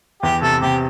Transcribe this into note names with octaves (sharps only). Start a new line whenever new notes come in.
E2 G4
C3 A4
C3 G4